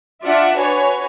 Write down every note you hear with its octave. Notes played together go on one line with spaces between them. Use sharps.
D4 F4 D5 E5 F#5
F#4 B4 C#5 G#5